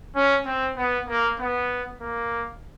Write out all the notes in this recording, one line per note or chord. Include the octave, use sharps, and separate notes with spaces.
C#4
C4
B3
A#3
B3
A#3